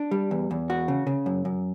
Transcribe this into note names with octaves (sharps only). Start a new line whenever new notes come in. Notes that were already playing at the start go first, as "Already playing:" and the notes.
Already playing: D4
G3
E2
E2
F#4
C#3
C#3
F#2
F#2